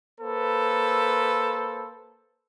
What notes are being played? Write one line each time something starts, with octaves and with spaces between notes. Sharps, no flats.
A#3 A4 B4 C5